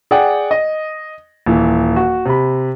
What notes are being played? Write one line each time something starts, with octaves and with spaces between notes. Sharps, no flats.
G#4 D5 F#5 G5
D#5
D#1 E3
F#4
C3 B5